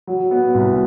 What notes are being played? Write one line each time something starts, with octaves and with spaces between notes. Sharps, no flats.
F#3
B3
C2